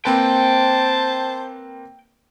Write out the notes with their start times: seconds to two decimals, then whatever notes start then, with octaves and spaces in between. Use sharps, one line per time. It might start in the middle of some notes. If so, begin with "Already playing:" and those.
0.05 A#3 C4 B4 C5 G5 A5